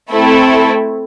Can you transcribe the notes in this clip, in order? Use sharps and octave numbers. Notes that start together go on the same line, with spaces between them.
A3 C4 E4 A4